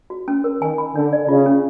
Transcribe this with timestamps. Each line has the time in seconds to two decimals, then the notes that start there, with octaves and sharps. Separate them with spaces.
0.10 F#4
0.28 C#4
0.44 A#4
0.61 D#3 G#5
0.78 B5
0.95 D3 D4
1.13 D5
1.28 C#3 F4
1.46 C#4